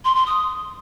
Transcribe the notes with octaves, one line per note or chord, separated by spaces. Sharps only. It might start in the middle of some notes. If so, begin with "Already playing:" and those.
C6
C6
D#6